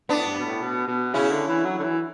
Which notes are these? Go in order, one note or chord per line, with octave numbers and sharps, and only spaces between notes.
A2 B3 D4
G2
B2
A2
B2
B2
C#3 C#4 E4
D3
E3
F#3
D3
E3